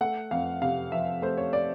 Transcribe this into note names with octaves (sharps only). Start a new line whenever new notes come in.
A3 F#5
F2 F5
C3 F5
F3 E5
A3 C5
C#5
D5